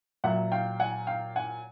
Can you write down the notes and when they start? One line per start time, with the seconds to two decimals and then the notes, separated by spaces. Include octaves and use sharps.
0.24 A#2 F#3 E5 F#5
0.52 F5 G5
0.80 F#5 G#5
1.07 F5 G5
1.36 F#5 G#5